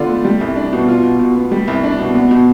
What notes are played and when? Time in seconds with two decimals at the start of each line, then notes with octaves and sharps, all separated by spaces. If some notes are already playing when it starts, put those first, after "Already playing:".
Already playing: D3 B3 D4 F4
0.09 A3
0.25 G3
0.41 C2
0.56 D4
0.73 B2
0.88 F4
1.03 B2
1.19 B2
1.36 B3
1.52 G3
1.68 C2
1.84 D4
1.99 B2
2.15 B3
2.31 B2